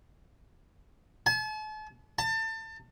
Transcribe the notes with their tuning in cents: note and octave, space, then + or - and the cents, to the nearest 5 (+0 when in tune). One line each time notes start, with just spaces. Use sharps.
A5 -40
A5 +30